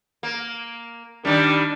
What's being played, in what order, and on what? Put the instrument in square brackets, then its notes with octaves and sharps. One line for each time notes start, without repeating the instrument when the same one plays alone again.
[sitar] A#3
[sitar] D#3 G3 [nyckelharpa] D4